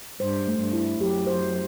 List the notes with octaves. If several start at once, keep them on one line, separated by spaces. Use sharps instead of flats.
G2 C5
A3
G2
E4
F#2 G4
C5